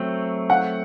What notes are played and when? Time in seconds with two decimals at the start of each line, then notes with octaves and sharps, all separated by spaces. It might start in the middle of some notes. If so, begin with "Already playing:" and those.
Already playing: F#3 A3 C4
0.50 F#5